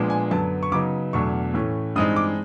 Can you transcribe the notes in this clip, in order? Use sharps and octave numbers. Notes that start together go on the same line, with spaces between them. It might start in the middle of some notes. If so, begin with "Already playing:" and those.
Already playing: A#2 F3 G#3 B3 D4
G#5
F#2 D3 F#3 B3 A5
C#6
C#3 F#3 B3 D#4 D6
E2 B2 F#3 A3 D4 C#6
A2 E3 A3 C#4
G2 E3 G#3 C4 D#4 D#6
D6